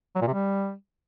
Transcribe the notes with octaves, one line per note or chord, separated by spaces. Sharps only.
F#3
A#2
C3
G3